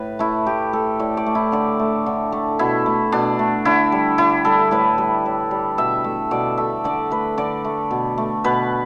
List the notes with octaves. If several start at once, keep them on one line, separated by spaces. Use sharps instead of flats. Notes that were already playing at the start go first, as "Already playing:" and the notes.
Already playing: A2 B4
A3 E4
A2 G4
A3 A4
A2 D5
D5
A3
E4
D3 D5
A3
D3
A3
B2 E4
A3
B2 D4
A3
D3 E4
G3
D3 E4
G3 A4
A2 B4
G3
A2
G3
B2 E5
A3
B2 D5
A3 E5
D3 D5
A3 B4
D3 D5
A3
B2
A3
B2 B4